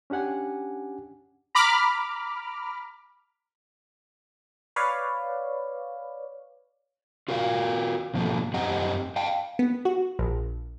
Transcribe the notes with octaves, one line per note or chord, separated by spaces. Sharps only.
C#4 D4 G4 F#5 G#5
A#5 B5 D6 F6
B4 C#5 D5 F5
F4 F#4 A#4 D5 F5
G#2 B2 F3 A#3 A4
F#2 C4 G4 D#5 F#5 A#5
F5 G5 A5
B3
F#4
A#1